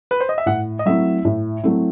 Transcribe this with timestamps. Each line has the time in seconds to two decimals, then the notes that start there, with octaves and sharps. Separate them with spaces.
0.11 B4
0.21 C5
0.29 D#5
0.38 E5
0.46 A2 F#5
0.79 D#5
0.86 F#3 A3 C4 E4 E5
1.25 A2
1.63 F#3 A3 C4 E4